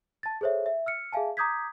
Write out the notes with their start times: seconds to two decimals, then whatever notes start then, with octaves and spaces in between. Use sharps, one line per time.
0.23 A5 A6
0.41 G#4 A4 C5 C#5 E5
0.66 E5
0.86 E6 F6 C#7
1.12 G#4 E5 F5 G#5 A5
1.37 A#5 D6 D#6 G6 G#6 B6